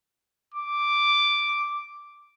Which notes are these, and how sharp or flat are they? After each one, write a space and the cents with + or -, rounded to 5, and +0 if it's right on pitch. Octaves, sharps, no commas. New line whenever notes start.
D6 +0